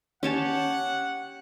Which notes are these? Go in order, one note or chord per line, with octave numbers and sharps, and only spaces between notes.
C#4 G4 C#5 F#5 A5